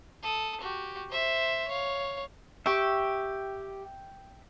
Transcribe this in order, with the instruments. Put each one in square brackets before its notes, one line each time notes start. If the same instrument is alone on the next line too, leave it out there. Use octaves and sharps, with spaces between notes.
[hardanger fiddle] A4 D#6
F#4 G4
C5 E5
C#5 F5
[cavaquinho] G4 C#6 [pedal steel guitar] E5 G5